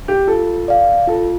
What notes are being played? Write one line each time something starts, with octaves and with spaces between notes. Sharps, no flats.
G4
F4 A4
D5 F5
F4 A4